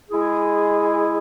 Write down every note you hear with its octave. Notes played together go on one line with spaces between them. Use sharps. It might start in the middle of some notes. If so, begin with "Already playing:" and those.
G#3 E4 G#4